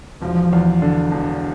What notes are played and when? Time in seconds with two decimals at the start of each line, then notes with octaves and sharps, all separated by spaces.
0.22 E1 F3
0.53 E2
0.82 D3
1.11 E1